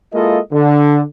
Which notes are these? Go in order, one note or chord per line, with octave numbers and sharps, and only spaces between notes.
G#3 A#3 E4 F4 A4 D#5
D3